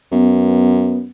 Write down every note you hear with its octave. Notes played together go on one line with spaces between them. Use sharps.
F#2 B3